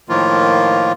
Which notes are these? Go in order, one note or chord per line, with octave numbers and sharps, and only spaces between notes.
A2 D#3 F3 A#3 F4